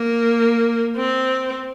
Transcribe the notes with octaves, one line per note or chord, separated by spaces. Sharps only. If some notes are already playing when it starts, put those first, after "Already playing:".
Already playing: A#3
C4